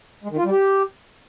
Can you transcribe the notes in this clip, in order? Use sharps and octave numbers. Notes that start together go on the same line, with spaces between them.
G#3
D#3
F4
G3
G4